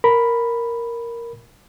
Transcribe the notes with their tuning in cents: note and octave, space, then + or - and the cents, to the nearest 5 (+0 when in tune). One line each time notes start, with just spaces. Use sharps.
A#4 +0 B5 +0